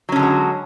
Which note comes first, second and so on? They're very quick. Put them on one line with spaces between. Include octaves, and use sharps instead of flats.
F#3 C#4 D3 G#3 F#4